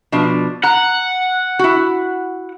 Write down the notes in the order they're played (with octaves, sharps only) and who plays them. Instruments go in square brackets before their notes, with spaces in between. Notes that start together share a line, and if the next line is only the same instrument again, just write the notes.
[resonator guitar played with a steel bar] B2 F3 D4
[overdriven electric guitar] F#5 [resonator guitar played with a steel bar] A#5
[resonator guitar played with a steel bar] E4 F#4